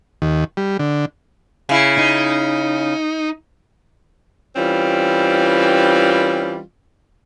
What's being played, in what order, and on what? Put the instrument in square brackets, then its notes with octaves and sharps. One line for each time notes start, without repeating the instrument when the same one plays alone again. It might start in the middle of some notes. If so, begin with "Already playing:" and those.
[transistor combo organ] D#2
G3
D3
[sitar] C#3 E4
[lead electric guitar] D#4
[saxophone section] E3 G3 C4 C#4 F4